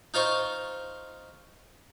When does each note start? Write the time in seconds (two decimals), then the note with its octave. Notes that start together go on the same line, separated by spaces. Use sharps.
0.14 D#4 F4 C5 C#6